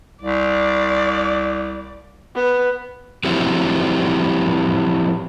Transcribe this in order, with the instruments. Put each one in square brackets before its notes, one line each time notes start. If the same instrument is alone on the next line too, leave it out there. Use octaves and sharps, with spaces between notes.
[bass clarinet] C2 [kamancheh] D5
[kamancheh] B3
[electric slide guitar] F3 F#3 C4 E4 F#4 G4